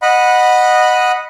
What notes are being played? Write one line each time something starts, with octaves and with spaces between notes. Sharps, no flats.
D#5 F#5 B5